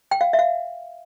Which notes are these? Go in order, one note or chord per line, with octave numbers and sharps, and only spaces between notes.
G5
F5
E5
F5